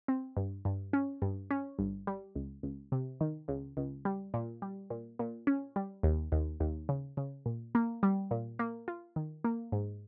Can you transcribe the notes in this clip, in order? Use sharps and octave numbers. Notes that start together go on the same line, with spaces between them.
C4
G2
G2
C#4
G2
C#4
G1
G3
C#2
C#2
C3
D#3
C#2
C#2
G3
A#2
G3
A#2
A#2
C#4
G3
D#2
D#2
D#2
C#3
C#3
A#2
A#3
G3
A#2
A#3
F4
D#3
A#3
G#2